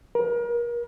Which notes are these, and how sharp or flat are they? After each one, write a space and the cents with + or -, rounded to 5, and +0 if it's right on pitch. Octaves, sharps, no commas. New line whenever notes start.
A#4 +35